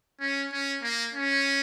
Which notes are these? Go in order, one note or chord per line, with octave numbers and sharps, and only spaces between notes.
C#4
C#4
A#3
C#4